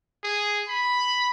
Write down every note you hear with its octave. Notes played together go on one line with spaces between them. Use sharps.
G#4
B5